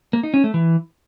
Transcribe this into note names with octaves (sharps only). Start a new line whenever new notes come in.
A#3
D#4
C#4
A3
E3